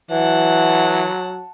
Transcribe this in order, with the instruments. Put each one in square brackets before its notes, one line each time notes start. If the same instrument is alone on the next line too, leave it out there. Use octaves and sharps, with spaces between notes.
[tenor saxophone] E3 [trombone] F#3 [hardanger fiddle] F#5 A5